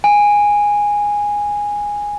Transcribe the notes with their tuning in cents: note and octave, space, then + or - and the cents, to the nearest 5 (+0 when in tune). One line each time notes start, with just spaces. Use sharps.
G#5 -10